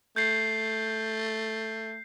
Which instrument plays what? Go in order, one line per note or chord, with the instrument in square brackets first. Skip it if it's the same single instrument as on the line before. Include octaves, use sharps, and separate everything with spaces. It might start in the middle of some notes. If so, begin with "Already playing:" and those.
[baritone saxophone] A3 [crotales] G6 C7